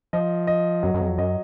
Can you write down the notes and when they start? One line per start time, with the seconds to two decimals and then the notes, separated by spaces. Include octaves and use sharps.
0.13 F3 D#5
0.47 D#5
0.83 F#2 F#3
0.94 F#2
1.01 F2
1.18 F#2 D#5